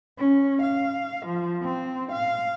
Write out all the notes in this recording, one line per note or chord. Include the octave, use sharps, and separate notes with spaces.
C#4
F5
F3
C4
F5